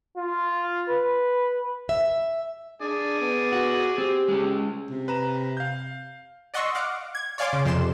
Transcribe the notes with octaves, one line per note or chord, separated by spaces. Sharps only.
F4
B4
E5
D4 G#4 D5
B3
F#4
C4 G4
G#3 C#4
C3
B4 A#5 E7
F5 G6
D5 D#5 F#5 C6 C#6 E6
F5 F#5 D6
G#6
C#5 D5 F5 G#5 C6 D6
C#3
F2 C3 C6 E7